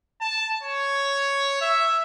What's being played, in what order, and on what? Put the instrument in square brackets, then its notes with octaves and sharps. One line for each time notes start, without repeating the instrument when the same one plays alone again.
[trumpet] A5
C#5
E5